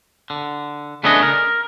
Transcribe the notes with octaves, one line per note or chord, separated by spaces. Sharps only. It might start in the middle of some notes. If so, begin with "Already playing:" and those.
D3
C#3 A3 B3 D4 G#4 D#5
A#4